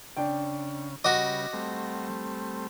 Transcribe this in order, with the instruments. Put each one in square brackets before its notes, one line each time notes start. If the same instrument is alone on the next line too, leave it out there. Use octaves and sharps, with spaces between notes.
[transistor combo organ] C#3 [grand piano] D4 G5
[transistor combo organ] C#3 G3 B4 [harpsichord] F#4 D#5 [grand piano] D6
[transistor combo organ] G3 A3 C4